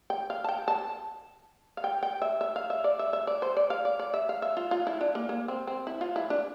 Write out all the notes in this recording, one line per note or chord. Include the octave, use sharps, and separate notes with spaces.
G5
F5
A5
G5
A5
F5
G5
G5
E5
E5
F5
E5
D5
E5
E5
D5
C5
D5
F5
D5
D5
E5
F5
E5
F4
F4
E4
D4
A#3
A#3
C4
C4
E4
F4
E4
D4